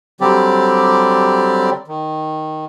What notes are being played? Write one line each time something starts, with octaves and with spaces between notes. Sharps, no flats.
D3 F#3 G3 C4 G4 D5
D#3